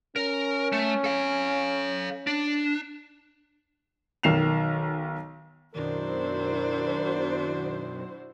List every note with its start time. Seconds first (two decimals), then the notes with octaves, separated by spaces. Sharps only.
0.16 C#4 A#4
0.73 A3
1.04 A4 F5
2.27 D4
4.23 B1 D#3 C7 E7 F7
5.74 F#2 B2 D#3 D4 E4 F#4 A#4 C5